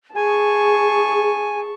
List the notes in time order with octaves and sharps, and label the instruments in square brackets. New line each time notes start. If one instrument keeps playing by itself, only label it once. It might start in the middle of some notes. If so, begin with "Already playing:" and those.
[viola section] G#4 [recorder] G#5 [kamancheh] A5 C#6